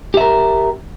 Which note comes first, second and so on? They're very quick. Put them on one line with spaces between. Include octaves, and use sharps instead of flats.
G4 E5 A#4